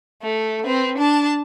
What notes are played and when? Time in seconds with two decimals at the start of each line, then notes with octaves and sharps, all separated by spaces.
0.22 A3
0.64 C4 B4
0.98 D4 A5